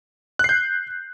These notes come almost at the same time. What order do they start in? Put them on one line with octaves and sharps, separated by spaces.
F#6 C7 G6